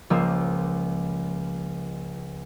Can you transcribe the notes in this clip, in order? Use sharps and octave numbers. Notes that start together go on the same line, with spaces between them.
C#2 F3 A#3 E6